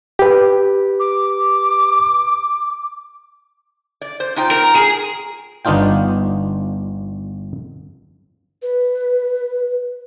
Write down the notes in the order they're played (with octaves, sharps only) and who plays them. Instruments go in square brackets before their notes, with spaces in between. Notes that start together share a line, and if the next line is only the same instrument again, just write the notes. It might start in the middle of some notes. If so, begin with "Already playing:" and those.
[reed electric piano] G4 B4
[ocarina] D6
[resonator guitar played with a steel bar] D5
C5
D#4 F4 G5
[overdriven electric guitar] A#4
G#4
[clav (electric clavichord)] G1 B3 D4 D#4 F4 G5
[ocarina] B4